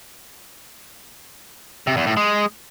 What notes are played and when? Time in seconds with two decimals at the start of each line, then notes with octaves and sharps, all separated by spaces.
1.87 C3
1.97 E2
2.07 A2
2.17 G#3